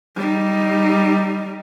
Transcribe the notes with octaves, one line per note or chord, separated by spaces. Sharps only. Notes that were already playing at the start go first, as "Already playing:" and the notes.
G3 D#4